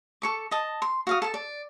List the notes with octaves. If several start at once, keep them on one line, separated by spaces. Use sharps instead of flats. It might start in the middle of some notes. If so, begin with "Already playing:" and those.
A4 C#6 D6
D#5 A5
C6
F#4 F5 D#6
A4 A5
D5